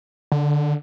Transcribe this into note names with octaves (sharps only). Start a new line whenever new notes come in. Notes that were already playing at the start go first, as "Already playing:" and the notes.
D3